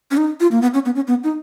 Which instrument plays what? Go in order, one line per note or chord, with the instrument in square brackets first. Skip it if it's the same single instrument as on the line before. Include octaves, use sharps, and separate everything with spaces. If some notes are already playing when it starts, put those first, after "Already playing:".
[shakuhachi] C#4
D#4
F4
A#3
B3
C#4
B3
C#4
B3
D#4